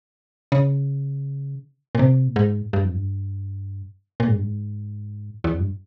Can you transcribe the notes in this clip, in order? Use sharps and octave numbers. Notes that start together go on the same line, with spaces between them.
C#3
A#2
C3
A#2
G#2
G2
F2
G2
A#2
G#2
G2
G#2
E2
F2
G2